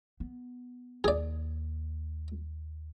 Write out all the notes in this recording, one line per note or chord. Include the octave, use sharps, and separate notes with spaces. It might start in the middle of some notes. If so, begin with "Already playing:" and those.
B3
D#2 G#4 D5